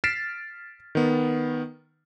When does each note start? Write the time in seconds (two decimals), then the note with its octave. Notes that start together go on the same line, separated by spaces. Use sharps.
0.04 F6 A6 B6 C7 D7 E7
0.95 D#3 B3